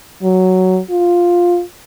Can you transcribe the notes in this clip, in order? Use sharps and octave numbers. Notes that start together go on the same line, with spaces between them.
F#3
F4